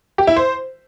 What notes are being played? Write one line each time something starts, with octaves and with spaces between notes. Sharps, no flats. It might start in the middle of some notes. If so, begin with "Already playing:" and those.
G4
E4
C5